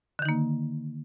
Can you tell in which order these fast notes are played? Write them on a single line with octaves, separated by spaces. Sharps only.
D3 D#3 D#4 A#3